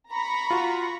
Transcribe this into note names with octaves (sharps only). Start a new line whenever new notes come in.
A#5 B5 C#6
F4 F#4